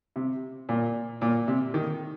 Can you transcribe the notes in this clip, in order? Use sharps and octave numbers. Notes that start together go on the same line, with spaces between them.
C3
A#2
A#2
C3
D#3